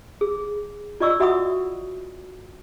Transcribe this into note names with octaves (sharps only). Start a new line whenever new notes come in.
G#4
F4 D5 D#5 C#6 E6
F#4 E5 F#5 B5 C#6 D#6